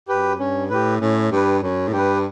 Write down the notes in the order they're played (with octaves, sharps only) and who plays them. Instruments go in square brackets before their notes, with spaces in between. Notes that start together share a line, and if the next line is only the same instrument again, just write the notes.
[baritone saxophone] F#2 [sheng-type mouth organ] G4 B4
[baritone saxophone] G2 [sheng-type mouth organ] C#4
[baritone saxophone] A2 [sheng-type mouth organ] G4 B4
[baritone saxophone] A2 [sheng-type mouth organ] C#4
[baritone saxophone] G2 [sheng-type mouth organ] G4 B4
[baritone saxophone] F#2 [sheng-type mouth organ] C#4
[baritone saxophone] A2
[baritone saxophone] G2 [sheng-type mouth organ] G4 B4